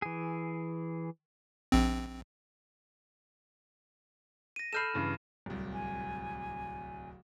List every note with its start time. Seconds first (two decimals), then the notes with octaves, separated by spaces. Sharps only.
0.02 E3 G#4
1.72 A#1 C4
4.56 A#6 D#7
4.73 A4 B5 F6 G6 C7 E7
4.94 G2 C#3 E3
5.46 D1 C2
5.73 G#5